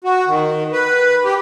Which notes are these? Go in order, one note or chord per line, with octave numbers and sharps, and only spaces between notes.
F#4
D#3
B4
G4